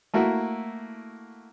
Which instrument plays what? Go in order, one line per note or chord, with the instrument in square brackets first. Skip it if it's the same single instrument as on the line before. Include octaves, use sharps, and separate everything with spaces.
[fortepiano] A3 A#3 E4 F#4